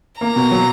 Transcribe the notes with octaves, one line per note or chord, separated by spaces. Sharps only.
A#3 A#5
B2
F#3